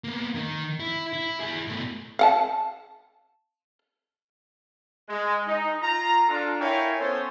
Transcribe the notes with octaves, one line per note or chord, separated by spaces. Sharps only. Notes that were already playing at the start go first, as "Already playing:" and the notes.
A#3 B3
D#3
E4
E4
E4 G#4
B2 A3
F5 F#5 A5
G#3
D#4
F4 A#5
D4 F4 A4
E4 A#4 C#5 F5 G5 G#5
B3 C#4 A4 C5 C#5